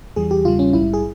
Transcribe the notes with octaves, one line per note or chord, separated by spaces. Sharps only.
E2 E3 G3 G#4
G4
E2 C#3 G3 F4
C#4
A#1 G#2 G3 E4
G#4